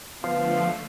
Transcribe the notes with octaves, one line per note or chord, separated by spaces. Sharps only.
D3 F3 A3 B3 F5